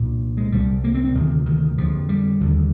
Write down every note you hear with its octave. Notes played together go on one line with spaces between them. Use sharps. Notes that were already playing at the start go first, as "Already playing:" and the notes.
Already playing: C2 A#2
G#3
C2 C3 G3
A#3
C4
C4
D2 C3 D#3
D#3
F2 D3 F3
G3
D#2 D3